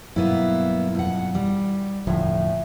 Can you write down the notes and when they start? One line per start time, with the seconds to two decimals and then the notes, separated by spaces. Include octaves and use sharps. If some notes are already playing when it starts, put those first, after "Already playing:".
0.16 G2 B2 F#3 A#3 B3 E4
0.95 F2 F#5
1.35 G3
2.07 E1 A2 D3 F3